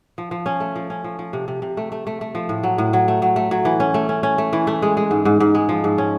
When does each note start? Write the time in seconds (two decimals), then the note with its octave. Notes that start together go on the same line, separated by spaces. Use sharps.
0.18 F3
0.31 F3
0.46 C#4
0.60 A3
0.76 F3
0.90 C#4
1.04 F3
1.19 F3
1.33 C3
1.48 C3
1.62 C3
1.77 A3
1.92 A3
2.07 A3
2.21 A3
2.35 F3
2.49 A2
2.63 F#3
2.78 A2
2.93 F#3
3.08 A3
3.22 F#3
3.36 A3
3.51 F#3
3.65 E3
3.80 C#4
3.94 A3
4.09 C#4
4.23 C#4
4.38 A3
4.53 E3
4.67 A3
4.82 G#3
4.97 G#3
5.11 G#2
5.25 G#2
5.40 G#2
5.55 G#3
5.69 F3
5.84 G#2
5.98 C#4